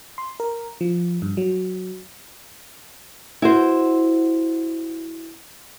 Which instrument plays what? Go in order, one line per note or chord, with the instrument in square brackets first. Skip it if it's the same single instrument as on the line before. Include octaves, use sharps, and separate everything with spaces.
[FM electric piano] C6
A#4
F3
G2
F#3
[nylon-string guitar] E4 F#4 C5